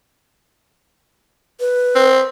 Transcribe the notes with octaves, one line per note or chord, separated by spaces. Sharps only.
B4
C4